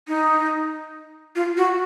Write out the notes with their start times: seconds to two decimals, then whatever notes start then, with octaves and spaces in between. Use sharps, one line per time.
0.08 D#4
1.36 F4
1.57 F#4